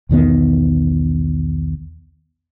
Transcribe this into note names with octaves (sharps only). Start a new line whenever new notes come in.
B1 E2 D#3 B3